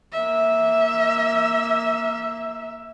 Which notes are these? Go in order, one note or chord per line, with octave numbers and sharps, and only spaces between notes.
A#3 E5